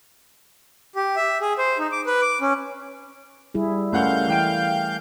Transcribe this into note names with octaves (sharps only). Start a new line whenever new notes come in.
G4
E5
G#4
C5
D#4
D6
B4
D6
C#4
G3 E4 G#4
C#2 A3 C#4 A#4 F5 F#5 G6
E3 G5 D7